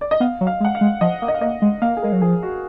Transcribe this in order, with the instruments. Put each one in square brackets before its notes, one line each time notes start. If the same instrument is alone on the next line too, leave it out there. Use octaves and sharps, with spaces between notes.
[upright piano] D5
D#5
[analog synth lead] B3 [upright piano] F5
[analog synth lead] F#3
[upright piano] F5
[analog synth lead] G#3
[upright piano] F#5
F5
[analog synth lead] G#3
[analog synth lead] F3 [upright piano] D#5
[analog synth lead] A#3
[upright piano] D#5
F5
[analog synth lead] A#3 [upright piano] D#5
[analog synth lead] G#3
[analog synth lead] A#3 [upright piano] F5
[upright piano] G#4
[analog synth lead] G#3 [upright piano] A#4
[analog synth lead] F#3
[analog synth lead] F3 [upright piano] G#4
[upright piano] F#4